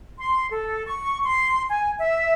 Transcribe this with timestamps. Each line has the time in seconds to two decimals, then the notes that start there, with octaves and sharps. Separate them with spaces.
0.18 C6
0.49 A4
0.85 C#6
1.24 C6
1.69 G#5
1.99 E5